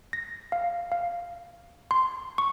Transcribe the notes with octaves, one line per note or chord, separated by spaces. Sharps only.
A#6
F5
F5
C6
C#6